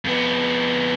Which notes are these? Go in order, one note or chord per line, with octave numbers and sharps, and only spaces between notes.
F2 B3